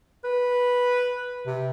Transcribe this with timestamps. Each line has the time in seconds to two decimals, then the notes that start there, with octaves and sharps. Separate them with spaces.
0.25 B4
1.47 C3